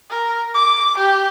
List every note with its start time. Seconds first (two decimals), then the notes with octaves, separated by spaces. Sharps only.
0.10 A#4
0.55 D6
0.98 G4